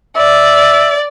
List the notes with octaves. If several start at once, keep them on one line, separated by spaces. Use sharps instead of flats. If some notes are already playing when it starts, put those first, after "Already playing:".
D5 E5